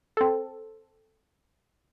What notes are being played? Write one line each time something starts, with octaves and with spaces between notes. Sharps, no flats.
C4 A4